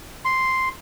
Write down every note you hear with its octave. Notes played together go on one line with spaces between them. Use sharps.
C6